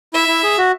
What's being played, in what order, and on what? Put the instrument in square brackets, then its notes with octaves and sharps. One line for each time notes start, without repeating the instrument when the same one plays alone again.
[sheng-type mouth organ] E4 [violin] E5
[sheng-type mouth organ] E4
G#4
F#4